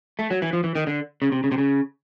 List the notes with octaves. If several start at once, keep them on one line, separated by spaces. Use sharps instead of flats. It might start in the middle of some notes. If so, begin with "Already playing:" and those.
A3
F#3
E3
F3
E3
D#3
D3
C#3
C3
C#3
C3
C#3